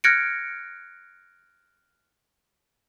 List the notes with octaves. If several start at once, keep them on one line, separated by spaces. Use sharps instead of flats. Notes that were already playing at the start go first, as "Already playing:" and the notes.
F6 F#6 G#6 A#6 C#7 D7